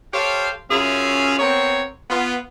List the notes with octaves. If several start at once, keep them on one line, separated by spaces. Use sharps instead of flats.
G4 A4 C5 C#5 F5
F#2 C#4 F4 G#4 E5 F5
B3 C4 A#4 C#5
B3 F4